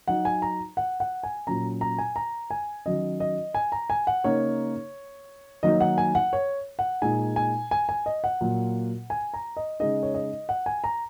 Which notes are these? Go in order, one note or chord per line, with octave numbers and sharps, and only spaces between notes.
F#3 D#4 F#5
G#5
A#5
F#5
F#5
G#5
A#2 F#3 C#4 A#5
A#5
G#5
A#5
G#5
D#3 F#3 C#4 D#5
D#5
G#5
A#5
G#5
F#5
C#3 A#3 D#4 C#5
D#3 F#3 A#3 D#4 D#5
F#5
G#5
F#5
C#5
F#5
A#2 G#3 D#4 G#5
G#5
G#5
G#5
D#5
F#5
A#2 F#3 A#3
G#5
A#5
D#5
C#3 G#3 D#4 D#5
C#5
D#5
F#5
G#5
A#5